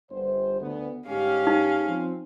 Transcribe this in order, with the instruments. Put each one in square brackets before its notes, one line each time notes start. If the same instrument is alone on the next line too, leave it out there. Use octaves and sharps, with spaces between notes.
[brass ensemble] G1 C5
D2 B3
[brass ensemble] G1 G#2 G4 [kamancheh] C#4 F5
[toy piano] D#4
[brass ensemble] F3 C4